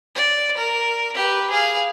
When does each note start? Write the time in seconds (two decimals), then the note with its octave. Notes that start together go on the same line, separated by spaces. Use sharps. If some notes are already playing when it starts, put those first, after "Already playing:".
0.15 D5
0.57 A#4
1.14 G4 B4
1.50 G#4 F5